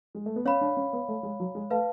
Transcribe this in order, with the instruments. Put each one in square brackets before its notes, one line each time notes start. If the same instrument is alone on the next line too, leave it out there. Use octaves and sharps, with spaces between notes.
[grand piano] G#3
A3
B3
[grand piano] C#4 [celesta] C#5 F5 B5
[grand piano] D4
C#4
B3
A3
G#3
F#3
G#3
[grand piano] A3 [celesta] B4 F5 A5